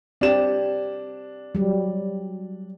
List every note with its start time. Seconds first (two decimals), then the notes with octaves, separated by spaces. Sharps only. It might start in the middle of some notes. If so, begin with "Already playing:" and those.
0.21 C4 D4 G4 E7
1.55 F#3 G3